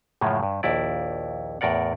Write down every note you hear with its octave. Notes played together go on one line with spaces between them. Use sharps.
F#2 A2 C#3 F3 G#3
G2
A#1 D#2 E4 D5
E2 A2 A#4 D5 F#5